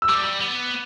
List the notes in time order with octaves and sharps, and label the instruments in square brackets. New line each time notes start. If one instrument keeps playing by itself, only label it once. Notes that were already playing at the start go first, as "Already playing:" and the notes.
[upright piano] E6
[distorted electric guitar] G3 [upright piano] D6
[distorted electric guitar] B3